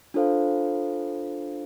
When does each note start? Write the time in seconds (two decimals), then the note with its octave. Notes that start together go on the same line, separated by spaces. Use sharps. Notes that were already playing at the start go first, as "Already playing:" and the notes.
0.14 D4 F4 A4 C5 F5